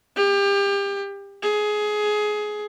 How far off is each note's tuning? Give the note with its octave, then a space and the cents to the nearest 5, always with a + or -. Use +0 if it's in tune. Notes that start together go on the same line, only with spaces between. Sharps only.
G4 +30
G#4 +20